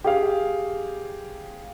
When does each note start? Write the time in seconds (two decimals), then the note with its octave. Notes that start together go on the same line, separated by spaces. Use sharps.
0.04 G4 G#4 F5